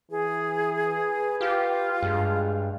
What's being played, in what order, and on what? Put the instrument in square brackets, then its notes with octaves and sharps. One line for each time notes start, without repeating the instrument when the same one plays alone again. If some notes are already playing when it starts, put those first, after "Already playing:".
[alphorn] E3 [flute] G#4
[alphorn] B4
[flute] F4 [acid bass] G4
[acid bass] G2 [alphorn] G#3